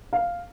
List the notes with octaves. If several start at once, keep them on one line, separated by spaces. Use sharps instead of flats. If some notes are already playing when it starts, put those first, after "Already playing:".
F5